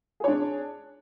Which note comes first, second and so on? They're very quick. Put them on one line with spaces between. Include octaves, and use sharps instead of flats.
G#4 C#5 D4